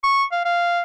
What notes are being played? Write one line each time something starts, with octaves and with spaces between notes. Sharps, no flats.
C#6
F5
F5